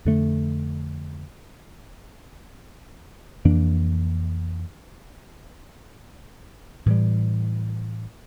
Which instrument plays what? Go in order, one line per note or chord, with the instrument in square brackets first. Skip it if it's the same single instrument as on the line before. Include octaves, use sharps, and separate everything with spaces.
[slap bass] F2 D3 A3
F2 E3 A#3 D4
A2 E3 G3